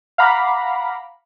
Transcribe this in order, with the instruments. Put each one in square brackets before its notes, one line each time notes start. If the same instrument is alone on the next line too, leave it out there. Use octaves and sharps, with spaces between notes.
[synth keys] F5 F#5 A#5 B5 D6